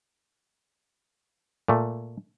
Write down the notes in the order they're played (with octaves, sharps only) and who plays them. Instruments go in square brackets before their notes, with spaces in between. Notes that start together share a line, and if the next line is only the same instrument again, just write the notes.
[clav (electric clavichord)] A#2 A3